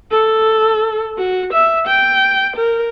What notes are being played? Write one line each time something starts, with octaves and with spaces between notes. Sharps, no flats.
A4
F#4
E5
G5
A#4